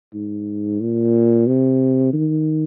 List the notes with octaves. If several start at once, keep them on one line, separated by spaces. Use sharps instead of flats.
G#2
A#2
C3
D#3